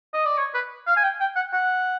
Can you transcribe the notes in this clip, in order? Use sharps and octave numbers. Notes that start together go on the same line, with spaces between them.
D#5
D5
C#5
B4
F5
G#5
G5
G5
F#5
F#5